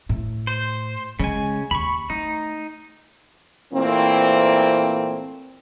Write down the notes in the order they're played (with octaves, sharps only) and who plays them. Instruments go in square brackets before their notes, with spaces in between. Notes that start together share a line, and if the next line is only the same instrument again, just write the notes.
[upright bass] A2
[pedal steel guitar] C5
[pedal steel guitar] C#3 G#5 [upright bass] G#3
[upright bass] D#2 [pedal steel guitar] B5 C#6
[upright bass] A3 [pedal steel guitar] D#4
[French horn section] A#2 E3 A3 A#3 C4